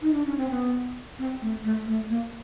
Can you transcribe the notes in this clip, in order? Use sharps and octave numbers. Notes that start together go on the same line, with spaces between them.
D#4
D4
C#4
C4
B3
C4
A3
A3
A3
A#3